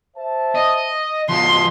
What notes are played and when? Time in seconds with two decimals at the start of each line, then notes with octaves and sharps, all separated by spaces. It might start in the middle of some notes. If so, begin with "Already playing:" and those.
0.17 C5 E5 A5
0.55 D#5
1.29 B2 F3 G#3 C6